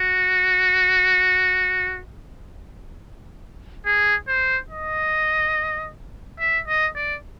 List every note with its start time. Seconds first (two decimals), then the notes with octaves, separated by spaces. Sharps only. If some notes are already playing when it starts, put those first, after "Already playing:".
Already playing: F#4
3.86 G#4
4.28 C5
4.70 D#5
6.40 E5
6.68 D#5
6.96 D5